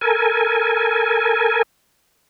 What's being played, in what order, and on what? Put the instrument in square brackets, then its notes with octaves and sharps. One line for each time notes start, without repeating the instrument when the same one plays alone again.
[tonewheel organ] A4 A#4 G#5